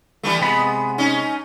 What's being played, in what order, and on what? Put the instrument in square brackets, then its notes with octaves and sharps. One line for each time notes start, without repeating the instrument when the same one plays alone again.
[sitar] E3 G3 A3
[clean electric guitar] C3 G#3 B5 [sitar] B3
[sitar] C#4 D#4